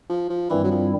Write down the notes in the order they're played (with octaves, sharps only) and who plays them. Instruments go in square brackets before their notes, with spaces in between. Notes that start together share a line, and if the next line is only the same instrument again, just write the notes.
[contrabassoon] F3
F3
[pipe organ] G2 D#3 G3 C4 E4 [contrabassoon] E3
[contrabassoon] F#3
F3